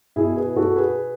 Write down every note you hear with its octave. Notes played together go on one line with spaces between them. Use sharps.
B2 E4 G#4
G#4 B4
F#4 A4
G#4 B4